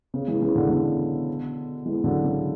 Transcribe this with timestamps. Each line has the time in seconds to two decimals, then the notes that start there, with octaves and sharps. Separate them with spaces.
0.14 C#3
0.27 E3 G#3
0.42 C#3 E3
0.56 B2 D3
0.70 B2 D3
1.86 E3 G#3
2.04 D3 F#3
2.24 C#3